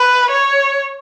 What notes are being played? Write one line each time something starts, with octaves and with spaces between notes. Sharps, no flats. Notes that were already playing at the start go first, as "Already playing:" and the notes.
Already playing: B4
C#5